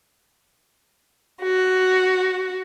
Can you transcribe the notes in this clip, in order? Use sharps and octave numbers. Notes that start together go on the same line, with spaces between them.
F#4